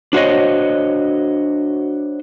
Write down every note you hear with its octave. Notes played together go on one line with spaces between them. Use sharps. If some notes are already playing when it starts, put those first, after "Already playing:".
D4 F#4 C5 C#5 D#5